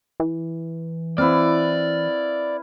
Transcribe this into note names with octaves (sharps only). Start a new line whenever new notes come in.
E3
C4 E4 B4 D5 F5